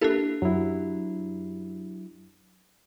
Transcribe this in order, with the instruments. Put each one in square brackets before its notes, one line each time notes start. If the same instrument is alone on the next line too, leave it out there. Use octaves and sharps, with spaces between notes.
[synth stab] A#3 E4 A4 [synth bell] D4 G4
[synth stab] F#2 [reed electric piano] F#3 E4